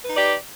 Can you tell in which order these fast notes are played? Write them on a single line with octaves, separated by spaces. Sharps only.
B4 D#4 D5 G4